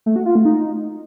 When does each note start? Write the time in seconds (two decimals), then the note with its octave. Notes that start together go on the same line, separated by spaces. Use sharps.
0.06 A3
0.16 F#4
0.26 F4
0.35 A3
0.45 D#4